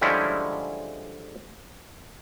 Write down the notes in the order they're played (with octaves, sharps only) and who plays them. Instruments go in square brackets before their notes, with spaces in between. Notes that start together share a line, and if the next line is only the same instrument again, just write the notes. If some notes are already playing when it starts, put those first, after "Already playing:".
[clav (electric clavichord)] D3 F3 G3 G#3 C#4 E4